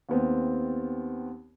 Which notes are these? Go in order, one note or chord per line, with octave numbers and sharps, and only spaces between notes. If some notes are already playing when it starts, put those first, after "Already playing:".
D#2 B3 C4